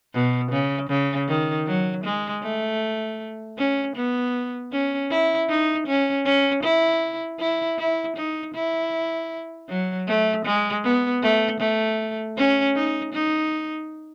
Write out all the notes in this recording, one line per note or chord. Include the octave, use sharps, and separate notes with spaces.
B2
C#3
C#3
D#3
F#3
G#3
A3
C#4
B3
C#4
E4
D#4
C#4
C#4
E4
E4
E4
D#4
E4
F#3
A3
G#3
B3
A3
A3
C#4
D#4
D#4